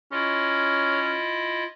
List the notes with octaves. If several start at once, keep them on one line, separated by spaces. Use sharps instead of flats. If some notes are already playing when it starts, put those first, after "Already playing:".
C#4 E4 F4 D#5